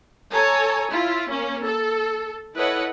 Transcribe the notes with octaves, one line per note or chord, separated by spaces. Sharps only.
A4 C#5 G#5 A#5
E4 F4
A#3 C#4
A4
E4 A4 B4 C#5 D#5 F#5